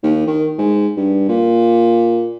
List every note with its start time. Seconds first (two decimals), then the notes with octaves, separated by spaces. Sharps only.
0.03 D#2
0.27 D#3
0.58 G#2
0.97 G2
1.29 A#2